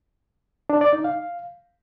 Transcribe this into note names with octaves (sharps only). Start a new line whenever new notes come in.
D4
D5
D#4
F5